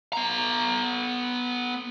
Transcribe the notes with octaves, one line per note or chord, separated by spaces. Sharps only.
B3 A#5